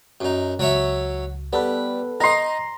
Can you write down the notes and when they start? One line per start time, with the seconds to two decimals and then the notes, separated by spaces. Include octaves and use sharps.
0.21 F#2 D#4
0.59 C#2 F#3 C#5 E5
1.53 G3 B3 A4 B4
2.20 D#4 D#5 A#5 C6